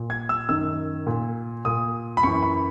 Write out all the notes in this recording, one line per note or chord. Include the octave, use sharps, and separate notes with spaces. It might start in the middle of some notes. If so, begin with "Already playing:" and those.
Already playing: A#2
G#6
E6
F#2 D#3 E6
A#2
A#2 D#6
B5
F#2 E3 C#6
B5